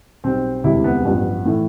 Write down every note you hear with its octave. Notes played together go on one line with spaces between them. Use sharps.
B1 B2 G3 C4
E1 D2 C3 G3 E4
B3
A1 G2 F3 B3
A2 E3